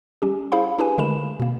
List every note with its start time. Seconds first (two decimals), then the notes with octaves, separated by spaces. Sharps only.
0.22 G3 C#4 G4
0.52 E4 G#4 C5 F5 B5
0.79 D4 E4 G4 G#4 B4 G#5
0.98 D3 G#3 A3 A#4 B5 E7
1.40 B2 A#3